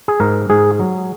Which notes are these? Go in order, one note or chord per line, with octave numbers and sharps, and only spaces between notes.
G#4
G#2 A#4
G#2 G#4
F#3